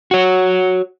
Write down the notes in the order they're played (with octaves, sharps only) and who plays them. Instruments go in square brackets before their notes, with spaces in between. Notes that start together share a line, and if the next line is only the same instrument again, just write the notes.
[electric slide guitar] F#4 C#5